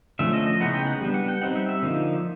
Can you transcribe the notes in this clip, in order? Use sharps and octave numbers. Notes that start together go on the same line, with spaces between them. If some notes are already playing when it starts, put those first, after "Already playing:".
D3 F3 A3 C#4 E5
D#5
D#5
C#3 E3 G#3 B3 D#4 F#5
G5
F#5
G3 B3 D4
F#5
G5
G3 C4 D#4 F#5
E5
E5
D3 F3 A#3 D#4